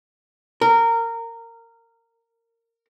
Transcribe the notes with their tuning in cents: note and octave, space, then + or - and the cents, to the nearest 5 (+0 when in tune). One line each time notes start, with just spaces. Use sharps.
A#4 -20